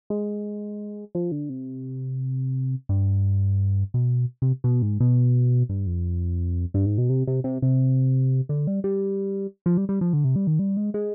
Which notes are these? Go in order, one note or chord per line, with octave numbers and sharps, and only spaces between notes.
G#3
F3
D3
C3
G2
B2
C3
B2
G#2
B2
G2
F2
G2
G#2
B2
C3
C3
C3
C3
D3
G3
G3
F3
G3
G3
F3
D3
C3
G3
D#3
G3
G#3
G#3